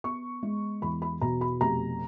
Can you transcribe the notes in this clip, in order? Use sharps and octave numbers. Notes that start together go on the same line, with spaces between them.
B3 C#6
G#3
E2 B5
B5
B2 A#5
B5
F1 A#5